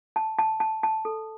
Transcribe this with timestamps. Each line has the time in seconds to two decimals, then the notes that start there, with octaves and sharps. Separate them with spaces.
0.16 A5
0.39 A5
0.60 A5
0.83 A5
1.05 A4